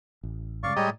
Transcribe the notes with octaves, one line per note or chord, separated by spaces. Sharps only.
A1
G2 C#3 G#3 D5 F5 C#6
A2 G3 G#3 C#5 D#5 A#5